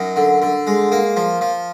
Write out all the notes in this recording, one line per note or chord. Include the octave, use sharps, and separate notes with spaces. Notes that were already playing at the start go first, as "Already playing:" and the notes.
Already playing: F#2 D#4
D3
D3
G#3
A#3
F3
F3